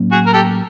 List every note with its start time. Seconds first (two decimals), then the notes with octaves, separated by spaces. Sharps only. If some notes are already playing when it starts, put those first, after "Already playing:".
Already playing: A2 F#3 A#3 C#4
0.12 F#4 G#4
0.26 A#4
0.33 G4 A4